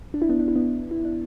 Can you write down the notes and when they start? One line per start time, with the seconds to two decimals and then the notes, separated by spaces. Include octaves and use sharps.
0.14 D4
0.22 E4
0.29 B3 D4
0.40 D4
0.48 E4
0.56 B3 D4
0.91 E4
1.05 D4